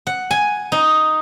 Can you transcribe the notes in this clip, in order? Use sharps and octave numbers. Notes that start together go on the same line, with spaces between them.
F#5
G#5
D#4